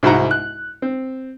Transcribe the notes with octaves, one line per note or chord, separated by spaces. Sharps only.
C2 G#2 F#4 F#5 A#5
F#6
C4